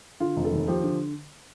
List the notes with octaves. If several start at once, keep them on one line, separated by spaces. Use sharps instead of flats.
D3 F4
F1
A4
D#2
F3 G4
D3